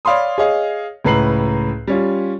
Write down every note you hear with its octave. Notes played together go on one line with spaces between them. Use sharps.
C#5 D5 F5 B5 C6 D#6
G#4 C#5 D#5 F5
C#2 A2 B4 A#5 C7 F#7
G3 C#4 F4